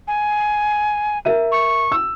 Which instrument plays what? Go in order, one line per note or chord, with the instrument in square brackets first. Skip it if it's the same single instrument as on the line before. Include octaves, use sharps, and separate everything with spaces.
[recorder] G#5
[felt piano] A#4 E5 D#7
[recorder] C#6
[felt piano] E6